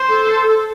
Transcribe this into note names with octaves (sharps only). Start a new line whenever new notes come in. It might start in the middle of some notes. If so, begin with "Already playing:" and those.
Already playing: C5
A4
A4